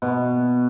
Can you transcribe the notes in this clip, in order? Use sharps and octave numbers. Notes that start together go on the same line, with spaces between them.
B2